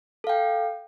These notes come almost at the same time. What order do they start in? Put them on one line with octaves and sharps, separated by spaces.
A4 F5 G5